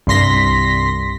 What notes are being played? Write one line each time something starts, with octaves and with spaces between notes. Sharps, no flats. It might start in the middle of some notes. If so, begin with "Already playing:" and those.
C2 G2 C6 A#6 B6